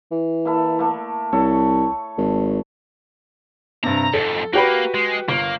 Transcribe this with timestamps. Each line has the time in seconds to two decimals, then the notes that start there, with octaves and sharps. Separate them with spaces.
0.11 E3
0.45 A#3 E4 A4
0.79 A3 A#3
1.33 C2 A4 C#5
2.18 G#1
3.83 G2 C3 A#5
4.14 F2 G#2 A4
4.53 A#3 F#4 G4 B4
4.94 G#3
5.28 G1 A#3